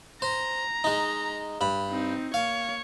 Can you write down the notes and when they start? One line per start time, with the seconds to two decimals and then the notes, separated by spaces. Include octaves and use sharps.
0.22 C5 A#5
0.84 G#3 D#4
1.61 G2 B5
1.90 C4 D#4
2.34 A#3 C#5 F5